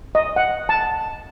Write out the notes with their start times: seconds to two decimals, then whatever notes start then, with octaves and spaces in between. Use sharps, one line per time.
0.15 D#5
0.36 F#5
0.69 A5